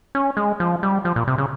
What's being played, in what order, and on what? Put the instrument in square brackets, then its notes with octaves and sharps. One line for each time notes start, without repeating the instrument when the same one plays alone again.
[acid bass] C#4
G#3
F3
G3
F3
A#2
C3
C#3